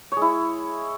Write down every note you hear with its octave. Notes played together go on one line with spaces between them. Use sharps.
G#3 E4 C#5